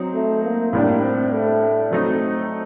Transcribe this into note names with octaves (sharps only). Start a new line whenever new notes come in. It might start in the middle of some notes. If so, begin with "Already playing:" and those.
Already playing: F#3 C4 D#4
A3
A#3
A2 G3 A#3 D4
C4
A3
F#3 A3 C4 D#4